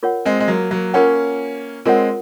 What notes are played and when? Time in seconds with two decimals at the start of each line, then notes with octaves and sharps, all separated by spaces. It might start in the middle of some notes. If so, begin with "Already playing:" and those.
0.03 F4 A#4 C#5 F#5
0.25 G#3 C4
0.40 G#3
0.48 F#3 A#3
0.71 F#3 A#3
0.94 A#3 C#4 F4 A#4 C#5 F#5
1.85 G#3 C4 F4 A#4 C#5 F#5